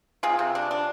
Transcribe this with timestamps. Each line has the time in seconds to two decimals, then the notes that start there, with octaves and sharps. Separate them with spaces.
0.23 C3 F4 G#4
0.39 C3
0.55 D4
0.71 D4